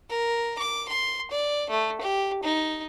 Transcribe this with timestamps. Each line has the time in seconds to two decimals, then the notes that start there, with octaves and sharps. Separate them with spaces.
0.10 A#4
0.59 D6
0.89 C6
1.31 D5
1.70 A3
2.01 G4
2.44 D#4